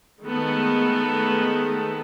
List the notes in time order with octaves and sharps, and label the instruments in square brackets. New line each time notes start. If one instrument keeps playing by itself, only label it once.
[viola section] D#3 G#3 A3 B3 A4